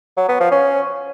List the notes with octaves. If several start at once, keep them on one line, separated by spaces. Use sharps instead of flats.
F#3
B3
F3
C#4